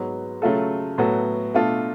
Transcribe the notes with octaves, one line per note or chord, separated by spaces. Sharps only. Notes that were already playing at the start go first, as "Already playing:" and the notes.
Already playing: G#2 F#3 B3
C#3 F#3 A3 F4 A4
A2 F#3 B3 F#4 A4
B2 A3 D4 F4 A4